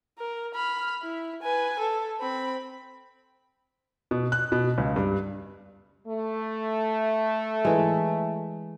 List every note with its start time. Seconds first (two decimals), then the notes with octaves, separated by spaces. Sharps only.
0.18 A#4
0.55 B5 F6
1.02 E4
1.42 B4 G#5
1.80 A4
2.20 C4 B5
4.11 B2
4.32 F#6
4.52 B2
4.78 C#2
4.96 G2
6.07 A3
7.65 E3 G#3